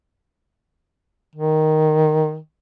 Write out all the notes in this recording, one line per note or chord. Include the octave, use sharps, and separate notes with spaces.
D#3